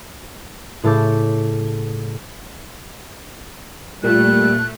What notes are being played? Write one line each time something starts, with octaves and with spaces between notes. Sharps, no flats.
A2 C#3 A4 D6 G6
A#2 G3 A3 F#6